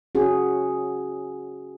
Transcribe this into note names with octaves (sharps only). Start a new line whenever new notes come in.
C#4 F#4 G#4